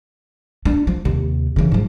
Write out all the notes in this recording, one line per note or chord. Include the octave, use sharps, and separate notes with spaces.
D4
F3
D#2 C3
C#3 E3
G#2 F3